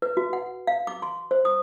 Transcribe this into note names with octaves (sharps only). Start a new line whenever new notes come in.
B4
F#4
F#5
F5
D6
C6
C5
D#6